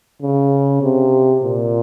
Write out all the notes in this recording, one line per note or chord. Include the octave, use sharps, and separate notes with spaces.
C#3
C3
A#2